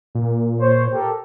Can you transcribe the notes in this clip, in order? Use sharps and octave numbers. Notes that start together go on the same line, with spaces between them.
A#2
C5 C#5
G4 A4 A#4